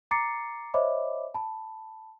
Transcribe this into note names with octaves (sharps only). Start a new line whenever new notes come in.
A#5 D6 A6 C7 C#7
C5 C#5 D#5 E5 B5 D6
A5 B5